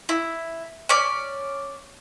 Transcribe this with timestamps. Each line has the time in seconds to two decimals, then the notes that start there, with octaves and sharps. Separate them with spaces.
0.09 E4
0.89 C#4 D5